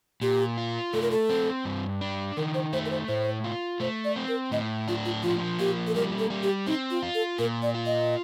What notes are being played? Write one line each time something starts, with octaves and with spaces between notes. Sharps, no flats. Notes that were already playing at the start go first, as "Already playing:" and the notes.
A#2 G4
F4
A3 A4
A#4
A4
C4
G2
D4
D#3 A#4
C5
A3 C5
A#4
C5
A2 C5
F4
A3 C5
D5
C4
A#4
A2 D#5
D4 F4
F4
F3 F4
A#3 G4
A4
G3 A#4
A4
G3
G4
C4 D#4
F4
F4
A4
A#2 A#4
D5
F4
D#5